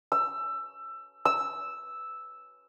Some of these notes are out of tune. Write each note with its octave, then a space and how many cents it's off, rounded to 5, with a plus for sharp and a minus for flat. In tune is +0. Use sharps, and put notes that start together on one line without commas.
E6 +20
E6 -5